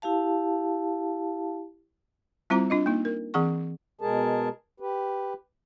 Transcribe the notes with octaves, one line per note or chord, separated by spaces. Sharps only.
E4 G4 F5 A5
G3 C4 E4 F4 C5 A#5
D4 F4 D#5
A#3 D#4
A#4
E3 C4 G#4 F#5 C#6
B2 G#3 G#4 A#4 A5
G4 B4